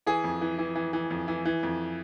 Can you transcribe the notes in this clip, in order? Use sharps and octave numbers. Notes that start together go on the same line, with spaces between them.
E3 G#4
F2
E3
E3
E3
E3
F2
E3
E3
F2